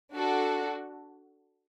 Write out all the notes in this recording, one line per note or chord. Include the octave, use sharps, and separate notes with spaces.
D4 F#4 A4